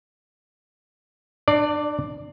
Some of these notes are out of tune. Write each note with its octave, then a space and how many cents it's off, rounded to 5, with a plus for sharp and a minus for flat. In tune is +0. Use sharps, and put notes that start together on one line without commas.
D4 +35 D5 +0